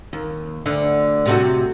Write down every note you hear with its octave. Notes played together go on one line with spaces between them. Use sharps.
D#2
D2 D3
A2 C3 F#4